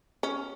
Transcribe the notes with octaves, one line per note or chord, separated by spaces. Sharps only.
C#4